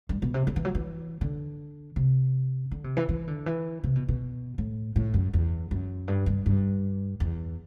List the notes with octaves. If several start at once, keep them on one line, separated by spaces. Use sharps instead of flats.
G2
B2
C3
D3
E3
F#3
E3
D3
C3
D3
C3
E3
E3
D3
E3
C3
B2
B2
A2
A2
F#2
E2
F#2
G2
G2
G2
E2